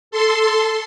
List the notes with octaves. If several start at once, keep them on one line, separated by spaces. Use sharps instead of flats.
A4 C6